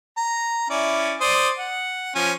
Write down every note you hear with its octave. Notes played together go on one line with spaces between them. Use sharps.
A#5
C#4 E4 D5
C5 D5 D#6
F#5
F3 C#4